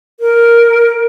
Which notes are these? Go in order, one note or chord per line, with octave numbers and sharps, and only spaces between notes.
A#4